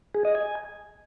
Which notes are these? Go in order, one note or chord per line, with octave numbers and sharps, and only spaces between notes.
G#4
D#5
G#5